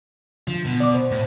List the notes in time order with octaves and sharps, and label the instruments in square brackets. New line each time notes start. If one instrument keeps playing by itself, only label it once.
[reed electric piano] D3 [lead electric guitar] F3
[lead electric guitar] B2
[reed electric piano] D5 D6
C5
[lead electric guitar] A2